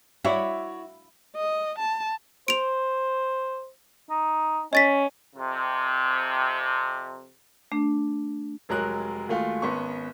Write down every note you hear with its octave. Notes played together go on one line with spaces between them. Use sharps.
E4 F#4 C#5 D5
D#5
A5
C5 D7 F7
D#4
C#4 D#5 A6 B6
F2 C3
A3 D4
F1 F#3 G#3 A#4 C#5 F#6
D#2 G#3 A3 F4 F#4 F5
G#1 B3 C#4 C6 C#6